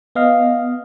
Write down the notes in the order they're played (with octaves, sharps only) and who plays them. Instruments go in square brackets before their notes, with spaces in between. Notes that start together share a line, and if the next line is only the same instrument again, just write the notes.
[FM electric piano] B3 D#5 F5